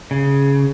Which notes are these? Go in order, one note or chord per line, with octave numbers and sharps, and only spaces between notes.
C#3